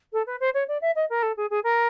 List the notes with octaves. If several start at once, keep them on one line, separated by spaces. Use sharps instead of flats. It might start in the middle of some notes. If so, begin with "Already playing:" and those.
A4
B4
C5
C#5
D5
E5
D#5
A#4
A4
G#4
G#4
A#4